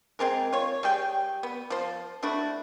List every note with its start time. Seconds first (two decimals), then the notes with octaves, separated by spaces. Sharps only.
0.19 G#3 C4 G#4 A#4
0.53 F4 C#5
0.83 G3 G#4 G5
1.43 B3
1.70 F3 C5
2.23 A3 D4 E4 F#4